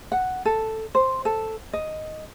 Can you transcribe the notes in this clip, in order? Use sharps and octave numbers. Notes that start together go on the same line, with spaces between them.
F#5
A4
C5
A4
D#5